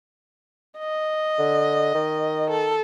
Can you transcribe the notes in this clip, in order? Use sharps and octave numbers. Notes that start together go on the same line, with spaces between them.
D#5
D3
D#3
A4